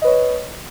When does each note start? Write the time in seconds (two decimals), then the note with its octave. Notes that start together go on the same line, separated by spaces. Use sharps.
0.02 D#5
0.04 B4
0.07 C#5